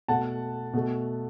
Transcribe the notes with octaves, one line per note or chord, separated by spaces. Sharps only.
B2 A3 F#5 A5
B2 A3